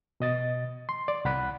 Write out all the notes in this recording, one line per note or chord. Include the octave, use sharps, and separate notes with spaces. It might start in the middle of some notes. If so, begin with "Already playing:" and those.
B2 D#5 A6
C6
D5
C2 F#5 B5 F#6